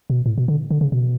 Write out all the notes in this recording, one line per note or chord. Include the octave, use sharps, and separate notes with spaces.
B2
A2
B2
D3
D3
C#3
B2